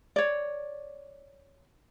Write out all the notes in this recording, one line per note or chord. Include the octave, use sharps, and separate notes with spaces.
C#5 D5